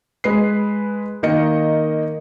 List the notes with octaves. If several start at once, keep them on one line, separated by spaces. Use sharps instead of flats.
G#3 B4 C7
D#3 A#3 D#5 C#7